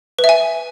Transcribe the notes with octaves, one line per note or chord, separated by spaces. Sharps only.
B4
E5
G#5